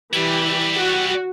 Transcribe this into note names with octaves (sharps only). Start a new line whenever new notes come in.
E3 G3 E4 G4
F#4